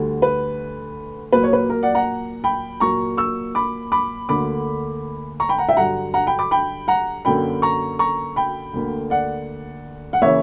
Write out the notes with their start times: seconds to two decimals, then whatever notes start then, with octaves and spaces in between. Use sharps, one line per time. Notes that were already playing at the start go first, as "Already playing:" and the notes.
Already playing: D2 D3 G3
0.22 B4
1.33 A#2 F#3 A#3 B4
1.43 C#5
1.53 B4
1.70 A#4
1.83 D5 F#5
1.95 F#5 A#5
2.44 G5 B5
2.80 A#2 F#3 A#3 A#5 C#6
3.17 C#6 E6
3.55 B5 D6
3.92 B5 D6
4.29 D2 D3 A#3 B5 D6
5.40 A#5 C#6
5.49 G5 B5
5.58 F#5 A#5
5.69 E5 G5
5.77 G2 D3 F#3 F#5 A#5
6.14 F#5 A#5
6.27 G5 B5
6.39 B5 D6
6.51 G5 B5
6.88 F#5 A#5
7.25 F#2 D3 A#3 G5 B5
7.62 A#5 C#6
7.99 A#5 C#6
8.36 G5 B5
8.74 D2 D3 A#3
9.10 D5 F#5
10.13 F#5
10.21 C#3 E3 A#3 C#5 E5